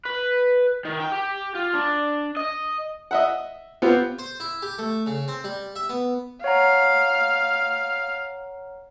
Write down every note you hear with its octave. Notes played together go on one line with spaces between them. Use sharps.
B4
D#3
G5
G4
F4
D4
D#5
D#5 E5 F#5
B3 C4 F4 G4
C5
E4
G4
A3
C#3
C4
G3
E5
B3
C#5 F5 F#5 A#5